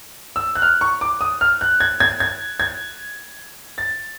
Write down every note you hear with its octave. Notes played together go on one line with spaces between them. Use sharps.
E6
F#6
F6
C#6
D6
D#6
F6
F#6
G#6
G#6
G#6
G#6
A6